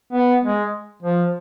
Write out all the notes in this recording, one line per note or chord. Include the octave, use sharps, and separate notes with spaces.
B3
G#3
F3